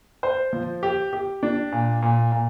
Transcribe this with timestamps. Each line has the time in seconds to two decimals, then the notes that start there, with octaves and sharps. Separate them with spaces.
0.23 C5
0.53 F3
0.83 G4
1.13 G4
1.43 D4
1.72 A#2
2.02 A#2
2.32 A#2